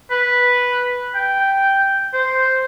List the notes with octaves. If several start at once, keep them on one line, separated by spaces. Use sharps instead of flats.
B4
G5
C5